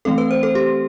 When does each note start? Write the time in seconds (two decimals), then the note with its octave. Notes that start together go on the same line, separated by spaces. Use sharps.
0.05 E3 A3 C4 A4
0.18 B4
0.31 C5
0.43 A4
0.55 G4